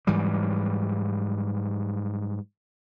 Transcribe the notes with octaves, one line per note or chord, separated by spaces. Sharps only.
G#2 E3 F#3 G3